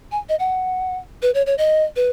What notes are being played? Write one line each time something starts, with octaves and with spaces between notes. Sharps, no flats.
G#5
D#5
F#5
B4
C#5
C#5
D#5
B4